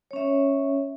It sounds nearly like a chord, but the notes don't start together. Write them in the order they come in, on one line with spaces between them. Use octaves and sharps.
C#5 C#4 E5